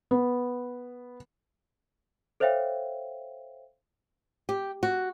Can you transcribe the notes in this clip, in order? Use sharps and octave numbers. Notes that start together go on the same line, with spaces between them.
B3
A4 C5 C#5 E5 F5 G5
G4
F#4